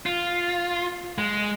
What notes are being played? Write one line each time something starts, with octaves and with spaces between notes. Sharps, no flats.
F4
G#3